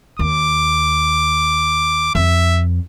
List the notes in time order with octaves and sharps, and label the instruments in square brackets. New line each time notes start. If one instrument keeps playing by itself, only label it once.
[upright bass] D#2 [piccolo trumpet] D6
[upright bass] F2 [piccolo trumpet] E5